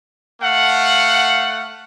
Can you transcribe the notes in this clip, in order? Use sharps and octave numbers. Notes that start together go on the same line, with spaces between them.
A3 F5 F#5